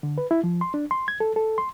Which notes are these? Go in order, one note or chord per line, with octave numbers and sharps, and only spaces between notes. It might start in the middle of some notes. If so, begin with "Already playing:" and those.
D3
B4
E4
F3
C6
D4
C6
G#6
A4
A4
C6